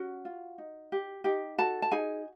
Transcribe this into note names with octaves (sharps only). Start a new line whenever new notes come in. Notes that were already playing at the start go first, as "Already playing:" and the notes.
Already playing: C#4 F#4 F#5
F4
D#4
G4
D#4 G4 G5
F#4 A4 A5
A5
D#4 G#4 G#5